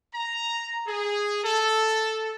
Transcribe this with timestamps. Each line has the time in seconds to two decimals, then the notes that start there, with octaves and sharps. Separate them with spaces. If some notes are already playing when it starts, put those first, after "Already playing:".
0.14 A#5
0.87 G#4
1.44 A4